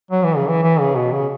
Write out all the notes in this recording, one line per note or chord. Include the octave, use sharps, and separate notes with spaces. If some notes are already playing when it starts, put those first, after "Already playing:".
F#3
E3
C#3
E3
E3
C#3
B2
C#3